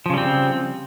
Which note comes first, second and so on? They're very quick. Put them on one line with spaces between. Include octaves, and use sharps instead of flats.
F3 C#3 G3 C4